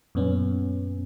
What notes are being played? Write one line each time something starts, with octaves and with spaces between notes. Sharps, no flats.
F#2 A#2 B3 C#4